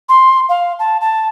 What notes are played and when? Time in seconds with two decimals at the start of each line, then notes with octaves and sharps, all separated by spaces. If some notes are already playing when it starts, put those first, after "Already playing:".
0.09 C6
0.49 F5
0.79 A5
1.01 A5